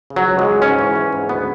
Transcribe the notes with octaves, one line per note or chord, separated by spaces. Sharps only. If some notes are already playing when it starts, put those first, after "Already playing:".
C#3
F#3
C#2
G#3
F#3
G#2 C#4
E3
E3
G#2
D2 B3